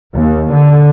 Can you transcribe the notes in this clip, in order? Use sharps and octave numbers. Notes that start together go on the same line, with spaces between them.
D#2
D3